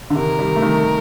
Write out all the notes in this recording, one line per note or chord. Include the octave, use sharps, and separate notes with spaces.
D3
C3 D#3 A#4
D#3 G3
A3
D#3 G3